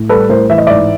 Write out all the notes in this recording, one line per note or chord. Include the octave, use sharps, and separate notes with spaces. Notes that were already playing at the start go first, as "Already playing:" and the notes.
Already playing: A2
G3 A4 B4
A2 A#4 C5
E3 E5
D#5
G#2 D5 E5